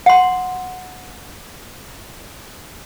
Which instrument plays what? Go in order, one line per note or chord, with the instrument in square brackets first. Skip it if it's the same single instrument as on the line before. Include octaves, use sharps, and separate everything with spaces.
[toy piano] F#5 C6